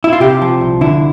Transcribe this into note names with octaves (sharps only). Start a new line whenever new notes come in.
E4
F4
C3 G4
F3
C2
D3 E4